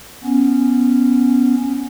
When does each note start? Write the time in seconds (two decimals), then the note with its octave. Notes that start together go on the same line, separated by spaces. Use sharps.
0.24 B3 C#4